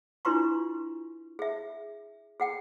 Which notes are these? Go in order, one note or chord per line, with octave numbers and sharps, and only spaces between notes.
D4 E4 F4 B4 C6 C#6
G#4 E5
G#4 F#5 G5